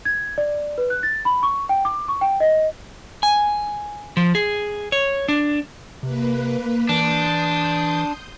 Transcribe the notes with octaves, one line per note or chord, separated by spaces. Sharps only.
G#6
D5
B4
F#6
A6
B5
C#6
G5
D6
C#6
G5
D#5
G#5
F3
G#4
C#5
D4
C3 A#3 B4
E3 D4 C6 D#6 G6